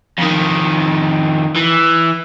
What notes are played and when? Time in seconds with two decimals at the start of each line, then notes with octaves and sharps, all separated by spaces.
0.18 F2 D#3
1.56 E3